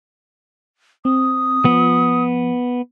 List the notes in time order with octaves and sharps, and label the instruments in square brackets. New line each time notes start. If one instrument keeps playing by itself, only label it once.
[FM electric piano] C4 [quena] D#6
[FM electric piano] F3 [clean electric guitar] B3